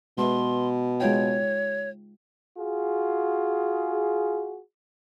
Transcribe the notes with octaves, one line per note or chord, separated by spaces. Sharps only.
B2 G#3 B4 E5 C6
G#3 F4 C#5 G5
F4 F#4 G#4